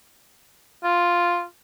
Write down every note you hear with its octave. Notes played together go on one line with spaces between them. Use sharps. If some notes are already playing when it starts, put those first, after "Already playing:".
F4